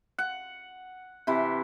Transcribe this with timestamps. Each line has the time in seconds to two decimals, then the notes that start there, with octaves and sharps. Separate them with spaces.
0.19 F#5
1.27 C3 E3